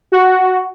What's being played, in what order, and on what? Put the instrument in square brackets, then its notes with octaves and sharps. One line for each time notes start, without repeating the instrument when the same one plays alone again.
[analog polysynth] F#4